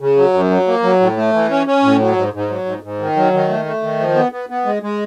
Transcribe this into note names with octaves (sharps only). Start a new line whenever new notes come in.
C#3
F#3
F#2
F#3
A#3
F#3
A2
A3
E3
C#4
C#4
A2
F#3
G#2
G#2
F#3
G#2
G#2
D#3
F#3
D#3
A3
A3
D#3
F3
B3
B3
B3
G#3
G#3